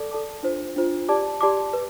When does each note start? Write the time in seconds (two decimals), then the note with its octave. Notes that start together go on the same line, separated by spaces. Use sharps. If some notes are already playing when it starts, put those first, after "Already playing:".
Already playing: A4 D5 A5 D6
0.11 A4 D5 A5 D6
0.43 D4 F4 C5
0.76 D4 F4 C5
1.09 G4 D5 A5 D6
1.41 G4 D5 A5 D6
1.73 B4